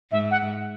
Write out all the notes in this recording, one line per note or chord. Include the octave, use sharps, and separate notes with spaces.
G#2 E5
F#5